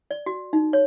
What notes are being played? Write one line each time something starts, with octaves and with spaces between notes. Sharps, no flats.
D5
F#4
D#4
C#5